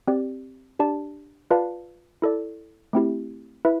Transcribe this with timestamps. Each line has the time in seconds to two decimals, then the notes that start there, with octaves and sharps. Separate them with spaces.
0.07 C4 G4 D5
0.79 D4 G4 D5 A5
1.51 F4 B4 D5 F5 A5
2.22 E4 A4 D5
2.93 A3 C4 E4 G4
3.65 E4 B4 E5